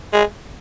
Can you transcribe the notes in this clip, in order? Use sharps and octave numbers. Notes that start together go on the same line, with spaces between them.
G#3